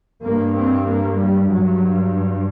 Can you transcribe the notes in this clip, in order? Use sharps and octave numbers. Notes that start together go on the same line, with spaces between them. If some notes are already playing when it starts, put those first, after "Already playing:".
G2 A#3
C4
A#3
G3
G2 F#3